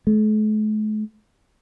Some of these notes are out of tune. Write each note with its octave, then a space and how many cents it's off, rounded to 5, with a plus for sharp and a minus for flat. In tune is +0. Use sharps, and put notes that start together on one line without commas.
A3 -45